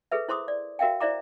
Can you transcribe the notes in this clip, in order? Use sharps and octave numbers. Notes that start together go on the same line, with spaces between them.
G#4 A4 B4 E5
E4 C5 C6 D6 D#6
D5
F#4 A#4 E5 F5 G5
E4 C5 D5 E5 A#5 D6